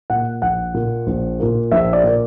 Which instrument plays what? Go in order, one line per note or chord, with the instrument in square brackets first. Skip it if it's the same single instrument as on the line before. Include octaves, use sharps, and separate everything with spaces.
[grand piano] A#2 A#3 F#5
A#1 F#5
A#2 A#3
A#1
A#2 A#3
A#1 E5
D5
A#2 A#3